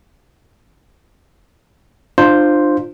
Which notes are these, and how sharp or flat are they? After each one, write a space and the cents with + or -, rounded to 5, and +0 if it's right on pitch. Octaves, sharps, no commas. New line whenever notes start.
D4 +35 F4 +0 C5 +0